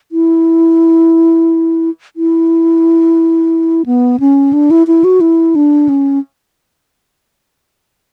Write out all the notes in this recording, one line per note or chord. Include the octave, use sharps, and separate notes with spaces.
E4
E4
B3
C#4
D4
E4
E4
F#4
E4
D4
C#4